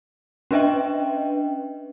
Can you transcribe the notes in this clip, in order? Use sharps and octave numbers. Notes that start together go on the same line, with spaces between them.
C#4 D4 B4 D#5 E5 G5